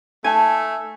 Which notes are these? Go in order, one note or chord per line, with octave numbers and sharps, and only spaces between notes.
A3 D#4 G#5 A5